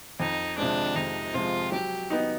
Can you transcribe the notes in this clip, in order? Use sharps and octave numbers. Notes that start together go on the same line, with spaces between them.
F2 D#4
C3 F3 G#3 D4
F2 D#4
C3 F3 G#3 F4
F#3 G4
B3 D#4